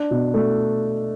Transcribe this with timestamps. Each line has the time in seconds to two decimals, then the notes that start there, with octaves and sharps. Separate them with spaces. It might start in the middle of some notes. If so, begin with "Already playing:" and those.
Already playing: D4
0.11 B2
0.34 A3